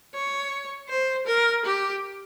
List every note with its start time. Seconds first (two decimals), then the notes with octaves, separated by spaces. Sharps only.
0.14 C#5
0.89 C5
1.27 A#4
1.65 G4